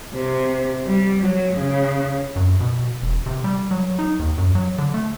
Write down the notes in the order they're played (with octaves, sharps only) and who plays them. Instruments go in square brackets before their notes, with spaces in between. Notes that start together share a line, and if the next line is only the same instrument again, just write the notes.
[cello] C3
G3
F#3
C#3
[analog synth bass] F#2
B2
E1
C3
G3
F#3
D#4
D#2
F#2
F#3
D3
A3